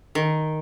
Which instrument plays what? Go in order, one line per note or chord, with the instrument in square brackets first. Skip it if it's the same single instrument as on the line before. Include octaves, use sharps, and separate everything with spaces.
[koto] D#3